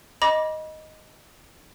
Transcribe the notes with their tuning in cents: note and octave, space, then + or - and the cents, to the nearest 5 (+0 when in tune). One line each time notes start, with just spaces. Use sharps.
D#5 +0 B5 -40 D6 +0